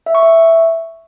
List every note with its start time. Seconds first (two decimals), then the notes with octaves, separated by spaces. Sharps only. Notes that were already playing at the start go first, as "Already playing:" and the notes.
0.06 E5
0.15 C#6
0.23 E5